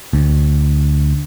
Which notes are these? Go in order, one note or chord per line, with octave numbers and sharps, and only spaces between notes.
D2